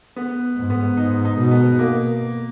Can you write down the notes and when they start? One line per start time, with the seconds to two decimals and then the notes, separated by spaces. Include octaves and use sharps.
0.16 B3
0.57 G#2
0.70 B3
0.97 G#2 D#4
1.25 D#4
1.38 B2
1.51 B3
1.79 A#3